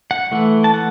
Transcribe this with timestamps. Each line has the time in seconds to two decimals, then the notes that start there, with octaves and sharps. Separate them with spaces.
0.11 F#5
0.31 E3 A3
0.64 A5
0.74 F#5